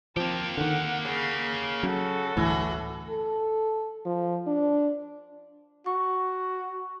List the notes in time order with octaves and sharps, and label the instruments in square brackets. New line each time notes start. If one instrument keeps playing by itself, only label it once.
[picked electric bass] F3 [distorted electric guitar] A#3 G4 [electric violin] C4 A5
[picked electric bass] D3 D#3 [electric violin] F#5
[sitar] C#3 [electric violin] C7
[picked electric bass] F#3 C#4 [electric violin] F#4 A4
[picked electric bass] G1 D2 A2 [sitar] E3
[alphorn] A4
F3
D4
[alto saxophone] F#4 [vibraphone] C#6